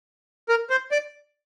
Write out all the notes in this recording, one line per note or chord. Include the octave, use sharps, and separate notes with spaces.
A#4
C5
D5